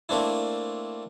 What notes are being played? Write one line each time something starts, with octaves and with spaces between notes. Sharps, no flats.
A3 A#3 C4 D4 E4